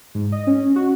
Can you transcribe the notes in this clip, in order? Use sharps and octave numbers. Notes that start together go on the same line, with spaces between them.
G#2
D#5
C#4
F#4